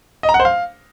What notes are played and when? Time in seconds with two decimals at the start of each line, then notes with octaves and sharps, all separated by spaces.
0.23 D#5
0.29 A#5
0.34 F#5
0.40 C5
0.45 F5